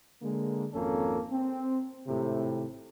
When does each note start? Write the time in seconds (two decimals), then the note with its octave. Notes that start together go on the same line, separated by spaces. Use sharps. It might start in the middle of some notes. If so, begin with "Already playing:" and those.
0.22 D3 G#3 A#3
0.73 G#1 F2 A#3 C#4 A4
1.32 C4
2.07 G#1 A2 C3